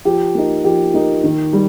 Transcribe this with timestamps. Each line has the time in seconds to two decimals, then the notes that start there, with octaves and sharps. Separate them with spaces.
0.05 F3 G4
0.35 A#3 D#4
0.64 F3 G4
0.94 A#3 D#4
1.24 D#3
1.53 G3